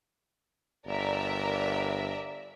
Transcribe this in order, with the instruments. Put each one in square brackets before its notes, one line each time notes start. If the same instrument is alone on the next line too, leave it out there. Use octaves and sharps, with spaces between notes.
[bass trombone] G1 [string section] A#4 D5 E5